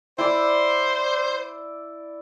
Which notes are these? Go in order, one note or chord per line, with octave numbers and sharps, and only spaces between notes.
E4 C5 D5